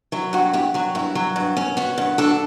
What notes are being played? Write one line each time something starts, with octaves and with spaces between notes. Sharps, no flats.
F#3 E4
G2 F#4
G2 E4 G4
F#3 F#4
G2 E4
F#3
G2
C#4
B3 F#4
G2
D4 F#4 A4